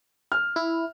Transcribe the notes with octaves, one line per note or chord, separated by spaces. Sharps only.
F6
E4